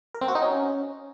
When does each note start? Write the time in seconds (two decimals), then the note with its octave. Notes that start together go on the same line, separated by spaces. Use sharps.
0.14 A#4
0.21 C4
0.28 F#4
0.35 D#4
0.42 C#4